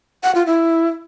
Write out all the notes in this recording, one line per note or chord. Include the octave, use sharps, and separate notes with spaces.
F#5
F4
E4